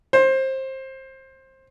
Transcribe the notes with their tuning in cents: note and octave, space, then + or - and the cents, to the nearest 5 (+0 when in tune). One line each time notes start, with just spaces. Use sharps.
C5 +20